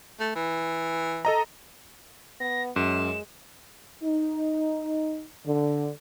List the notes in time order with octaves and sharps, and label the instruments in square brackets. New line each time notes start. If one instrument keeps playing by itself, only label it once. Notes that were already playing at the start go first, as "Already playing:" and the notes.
[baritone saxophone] A3
E3
[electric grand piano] A4 D#5 A#5
[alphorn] B3 [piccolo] A#6
[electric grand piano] F#2 [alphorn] G#3 [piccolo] E7
[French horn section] D#4
D3